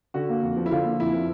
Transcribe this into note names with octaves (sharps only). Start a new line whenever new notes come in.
D3 F#4
A#3
F2
F3
E4
D3 F4
A#3
F2 E4
F3